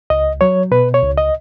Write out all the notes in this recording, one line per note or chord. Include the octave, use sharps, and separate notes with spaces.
C#2 D#5
F#3 C#5
B2 B4
C#5
C#2
D#5